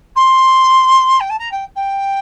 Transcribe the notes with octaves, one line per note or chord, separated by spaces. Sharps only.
C6
G5
A5
A#5
G5
G5